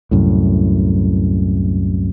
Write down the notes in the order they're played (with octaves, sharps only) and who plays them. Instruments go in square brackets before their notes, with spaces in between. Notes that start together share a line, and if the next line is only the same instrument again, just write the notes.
[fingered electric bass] C2 F#2 A2